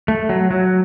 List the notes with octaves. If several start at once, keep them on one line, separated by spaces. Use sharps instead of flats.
A3
F#3
F#3